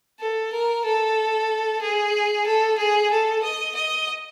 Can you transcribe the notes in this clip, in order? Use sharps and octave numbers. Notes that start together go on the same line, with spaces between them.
A4
A#4
A4
G#4
A4
G#4
A4
D#5
D#5